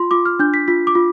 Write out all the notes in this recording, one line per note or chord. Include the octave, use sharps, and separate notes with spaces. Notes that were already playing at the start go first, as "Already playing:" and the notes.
Already playing: F4 C6
F4 D6
F6
D4 G6
B6
F4 B6
D6
F4